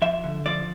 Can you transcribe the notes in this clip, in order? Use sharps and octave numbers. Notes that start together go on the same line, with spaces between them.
F3 E5
D3
F3 D5